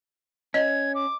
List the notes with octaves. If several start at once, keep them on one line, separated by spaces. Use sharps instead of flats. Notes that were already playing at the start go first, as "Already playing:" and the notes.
C#4 D#5 G#6
D6